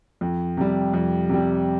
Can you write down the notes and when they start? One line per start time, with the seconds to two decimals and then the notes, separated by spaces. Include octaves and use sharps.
0.21 F2
0.57 C3 G3
0.94 F2
1.29 C3 G3